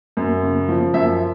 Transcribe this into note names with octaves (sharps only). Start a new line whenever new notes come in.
F#2
C#3
F3
F#2 E5